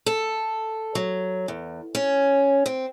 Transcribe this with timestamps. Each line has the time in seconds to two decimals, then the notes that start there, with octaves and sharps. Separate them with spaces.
0.06 A4
0.95 F#3
1.48 E2
1.95 C#4
2.66 C4